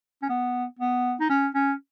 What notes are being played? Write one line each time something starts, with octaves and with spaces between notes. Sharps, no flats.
C#4
B3
B3
D#4
C#4
C#4